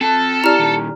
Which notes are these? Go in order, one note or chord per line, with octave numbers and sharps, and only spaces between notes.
C4 A4 A5
E4 G4 D5 A#5 F6
A#2 D#3